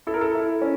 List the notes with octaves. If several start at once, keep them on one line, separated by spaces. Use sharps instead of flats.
E4 A4
A#4
A4
E4
C#4